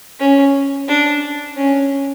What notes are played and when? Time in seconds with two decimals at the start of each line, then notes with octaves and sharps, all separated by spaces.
0.20 C#4
0.88 D4
1.57 C#4